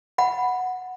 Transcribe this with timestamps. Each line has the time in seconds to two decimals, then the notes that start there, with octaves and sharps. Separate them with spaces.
0.18 F#5 B5